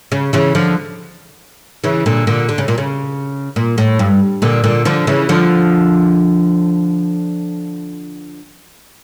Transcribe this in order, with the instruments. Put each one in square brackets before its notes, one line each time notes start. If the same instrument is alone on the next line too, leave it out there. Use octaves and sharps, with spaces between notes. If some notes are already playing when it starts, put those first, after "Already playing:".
[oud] C#3
C#3 E3
D3 F3
C#3 E3
A#2 D3
A#2 D3
D3
C#3
A#2
C#3
A#2
A2
G2
A#2 D3
A#2 D3
D3 F3
C#3 E3
D3 F3